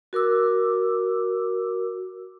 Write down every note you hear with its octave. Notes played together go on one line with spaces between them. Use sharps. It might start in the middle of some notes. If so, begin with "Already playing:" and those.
F#4 A#4 D6 E6